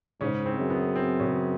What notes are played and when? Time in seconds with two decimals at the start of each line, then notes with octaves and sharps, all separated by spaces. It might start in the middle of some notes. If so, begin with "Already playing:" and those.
0.21 G#2 C#3 C#4
0.46 C4
0.59 F#2
0.70 B3
0.96 C4
1.20 C#3 C#4